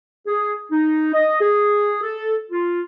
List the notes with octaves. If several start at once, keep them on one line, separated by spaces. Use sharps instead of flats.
G#4
D#4
D#5
G#4
A4
F4